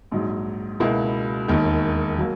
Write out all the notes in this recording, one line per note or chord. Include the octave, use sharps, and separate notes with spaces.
A#1 G#2 F#3
C#2 B2 A#3 E4
E1 D#2 D#3
F#3 A#3